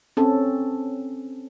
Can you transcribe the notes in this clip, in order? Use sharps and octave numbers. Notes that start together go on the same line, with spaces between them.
C4 C#4 A4